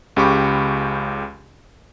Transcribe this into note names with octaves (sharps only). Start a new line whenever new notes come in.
C#2 C#3 G4 B5 C#6 D6